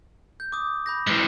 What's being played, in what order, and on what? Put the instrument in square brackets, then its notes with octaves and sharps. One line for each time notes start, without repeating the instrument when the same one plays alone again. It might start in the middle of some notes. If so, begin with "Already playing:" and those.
[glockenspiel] G6
D6 D#6
B5 G6 A#6
[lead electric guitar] G#2 E3 [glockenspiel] D7